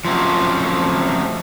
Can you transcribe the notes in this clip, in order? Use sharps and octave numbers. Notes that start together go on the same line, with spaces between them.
F3 F#3 A3 C4 C#4